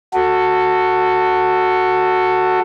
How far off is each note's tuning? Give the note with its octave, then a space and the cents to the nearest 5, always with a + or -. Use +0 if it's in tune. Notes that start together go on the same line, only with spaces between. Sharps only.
F#4 +0 A4 +15